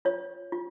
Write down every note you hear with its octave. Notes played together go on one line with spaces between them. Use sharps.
F4 C#5
F4